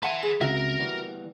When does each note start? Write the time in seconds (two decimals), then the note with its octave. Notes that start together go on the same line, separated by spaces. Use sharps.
0.03 B4 E5 F#5 G#5 A5 C6
0.23 G#4
0.41 C#2 C3 F#4 A#4 E5
0.79 E3 G3 B3